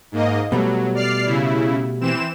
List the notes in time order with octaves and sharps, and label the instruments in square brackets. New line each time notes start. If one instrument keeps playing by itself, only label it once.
[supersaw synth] G#2 A#3 D#5
[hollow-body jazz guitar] B2 G3 A3 [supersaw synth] F#3
[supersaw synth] D5 F6 C7
C#3 E4
E3 C4 E7